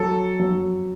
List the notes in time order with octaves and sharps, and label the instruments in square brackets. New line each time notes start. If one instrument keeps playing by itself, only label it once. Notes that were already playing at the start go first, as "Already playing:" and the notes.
Already playing: [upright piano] F#3 [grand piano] A4
[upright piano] F#3